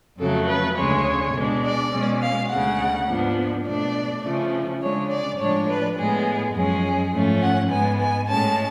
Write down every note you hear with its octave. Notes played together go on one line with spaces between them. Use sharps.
F2 C#3 F#3 A3 A4
B4
D2 C#3 G#3 C#5
B2 G#3 D4
D5
B2 G#3 C#4
F5
D2 C#3 G#3 F#5
G#2 F3 B3 D4
B2 A3 D4 D5
C#3 F3 A3 C#4
C#3 G#3 D4 C#5
D5
A2 F3 G#3 D4 C#5
B4
A2 G#3 B3 G#4
F#2 F3 G#3 C#4 G#4
G#2 F3 A3 C#4
F#5
G#2 G#3 B3 G#5
G#5
A2 G#3 C#4 A5